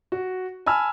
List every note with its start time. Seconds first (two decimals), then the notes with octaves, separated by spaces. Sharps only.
0.12 F#4
0.66 G#5 A5 B5 E6 F6